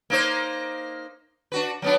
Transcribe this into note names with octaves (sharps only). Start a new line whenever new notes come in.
A#3 D#4 C5
D4 F#4 B4
F#3 B3 D4